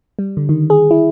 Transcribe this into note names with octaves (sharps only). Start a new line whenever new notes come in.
G3
D3
D#3
G#4
E4